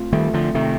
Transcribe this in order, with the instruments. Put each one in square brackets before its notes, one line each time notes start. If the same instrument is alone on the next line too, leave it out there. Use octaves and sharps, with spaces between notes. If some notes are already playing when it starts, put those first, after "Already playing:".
Already playing: [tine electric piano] A3 C4 F4
[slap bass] D#3 G3 [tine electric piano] A3
[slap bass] D3 F3
[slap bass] C3 D#3 [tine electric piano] A3